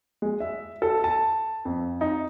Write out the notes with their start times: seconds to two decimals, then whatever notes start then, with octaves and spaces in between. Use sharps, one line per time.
0.22 G#3
0.40 E5
0.82 A4
1.04 A5
1.65 F2
2.01 D#4